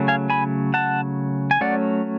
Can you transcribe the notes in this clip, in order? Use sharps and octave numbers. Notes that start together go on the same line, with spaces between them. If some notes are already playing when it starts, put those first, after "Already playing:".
Already playing: C#3 F#3 A3
F5 G#5
G#5 B5
F#5 A5
G#5
F#3 A3 C#4 D5 F#5